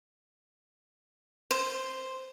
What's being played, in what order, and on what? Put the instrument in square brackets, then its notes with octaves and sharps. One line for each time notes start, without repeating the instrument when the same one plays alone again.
[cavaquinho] C5